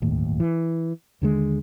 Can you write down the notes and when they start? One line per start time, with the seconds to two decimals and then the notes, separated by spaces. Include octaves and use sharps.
0.02 D1 G1 D#2 A2
0.40 E3
1.22 D#2 D3 G#3